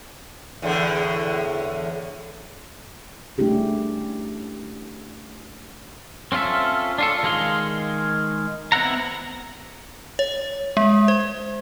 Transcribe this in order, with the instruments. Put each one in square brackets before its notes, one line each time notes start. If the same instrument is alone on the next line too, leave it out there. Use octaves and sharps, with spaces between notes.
[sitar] E2 A2 D3
[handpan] A3 C#4 D4 E4 G4 G#4
[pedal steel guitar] C4 C#4 F4 A4 E5
D4 F4 A4
D#3 G#3 G#4 F5 C6
B3 C4 E4 F#5 A#5
[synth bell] C#5
G#3
C5